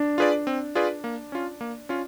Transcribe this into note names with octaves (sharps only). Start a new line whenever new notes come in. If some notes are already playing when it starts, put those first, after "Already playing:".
Already playing: D4
F4 G#4 B4 D5
C4
F4 G#4 B4 D5
A#3
C#4 F4
A#3
C#4 F4